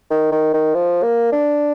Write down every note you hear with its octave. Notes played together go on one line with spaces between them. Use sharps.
D#3
D#3
D#3
F3
A#3
D4